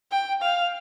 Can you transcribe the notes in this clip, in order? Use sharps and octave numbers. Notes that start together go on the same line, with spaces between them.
G5
F5